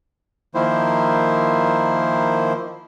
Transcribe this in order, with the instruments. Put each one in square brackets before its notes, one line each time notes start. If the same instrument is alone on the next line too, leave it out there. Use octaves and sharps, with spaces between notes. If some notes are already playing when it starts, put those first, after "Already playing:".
[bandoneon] D#3 F3 A#3 E4 C5